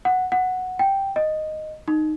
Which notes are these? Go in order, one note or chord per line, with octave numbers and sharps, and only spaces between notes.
F#5
F#5
G5
D#5
D#4